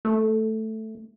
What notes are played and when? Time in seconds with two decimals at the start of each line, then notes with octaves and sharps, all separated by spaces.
0.05 A3